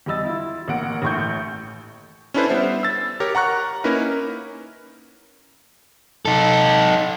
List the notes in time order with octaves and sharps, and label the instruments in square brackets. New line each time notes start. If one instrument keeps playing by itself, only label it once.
[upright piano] E2 G3 D#5 E6 A6
E4 F4
A1 A#3 F#5 D7
A1 A2 C#6 G6
[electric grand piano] C#4 D4 E4 A4 B4 C5
G3 B3 C5 E5
E6 A6
G4 A#4 C#5
F#5 A#5 C#6 F#6
A#3 C#4 D#4 E4 A#4 B4
[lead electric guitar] D#4 A4